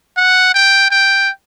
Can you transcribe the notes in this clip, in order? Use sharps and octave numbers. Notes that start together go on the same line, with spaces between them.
F#5
G5
G5